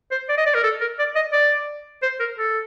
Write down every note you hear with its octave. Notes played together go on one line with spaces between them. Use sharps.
C5
D5
D#5
D5
A#4
A4
A#4
D5
D#5
D5
C5
A#4
A4